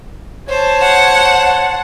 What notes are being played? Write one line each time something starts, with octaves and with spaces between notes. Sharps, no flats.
C5 C#5 A5
F#5